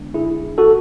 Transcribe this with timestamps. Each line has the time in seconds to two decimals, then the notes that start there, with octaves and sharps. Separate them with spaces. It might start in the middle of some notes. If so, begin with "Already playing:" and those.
Already playing: D3 G#3 B3 D4
0.14 E4 G#4
0.58 F#4 A4